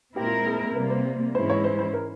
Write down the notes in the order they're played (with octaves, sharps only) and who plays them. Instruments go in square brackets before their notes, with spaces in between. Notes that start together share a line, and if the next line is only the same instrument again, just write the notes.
[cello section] A#2 G#3 C4 E4 A#4 [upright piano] G4
[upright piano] F4
G#4
[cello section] C3 G3 A#3 [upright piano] A#4
[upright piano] C5
[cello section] G#2 E3 G#3 C#4 E4 [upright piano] C5
[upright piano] C#5
C5
C5
A#4